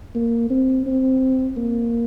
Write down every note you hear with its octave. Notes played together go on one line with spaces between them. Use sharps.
A#3
C4
C4
A#3